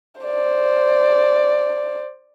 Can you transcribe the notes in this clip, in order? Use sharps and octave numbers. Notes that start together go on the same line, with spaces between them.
C5 D5